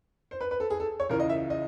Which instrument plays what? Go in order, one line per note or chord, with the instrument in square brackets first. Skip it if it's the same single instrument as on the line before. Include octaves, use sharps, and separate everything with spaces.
[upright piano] C5
B4
B4
A4
G#4
A4
C#5
C#2 C#3 E3 A#4
D#5
E5
D#5